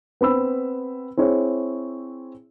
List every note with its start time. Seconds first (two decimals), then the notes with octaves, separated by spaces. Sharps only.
0.21 B3 C4 B5 E6
1.17 C4 E4 G#4 C#5